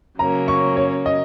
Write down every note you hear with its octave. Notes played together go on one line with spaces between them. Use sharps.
C#3 F#3 A#3 C#4 A#5
C#6
C#5
D#5